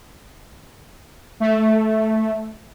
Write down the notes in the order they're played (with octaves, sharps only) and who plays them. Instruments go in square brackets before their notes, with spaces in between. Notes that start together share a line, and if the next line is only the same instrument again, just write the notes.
[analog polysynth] A3